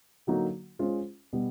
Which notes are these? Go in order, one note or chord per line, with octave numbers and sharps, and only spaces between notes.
D3 F#3 A#3 D#4 F#4
G#3 C#4 F4 G#4 C5
B2 G3 B3